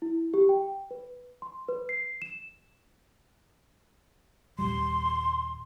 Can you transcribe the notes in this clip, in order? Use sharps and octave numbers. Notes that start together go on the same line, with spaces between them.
E4
G4
G5
B4
C6
B4
C7
E7
D#1 C#2 G3 C6